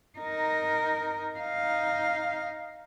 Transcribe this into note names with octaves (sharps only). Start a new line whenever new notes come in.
D#4 A#4
D#4 F5